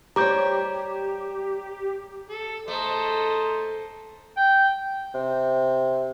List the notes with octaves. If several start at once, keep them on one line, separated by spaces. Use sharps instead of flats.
G3 G4 C5 C#5 A#5 D6 G6
A4
A3 C5 D#5 A#5
G5
C3